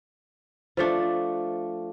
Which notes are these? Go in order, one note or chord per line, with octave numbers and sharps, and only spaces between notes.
F3 A3 D4